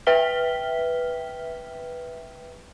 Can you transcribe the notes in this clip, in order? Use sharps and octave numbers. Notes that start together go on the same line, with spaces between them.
B4 E5 G5 F6 B6 G7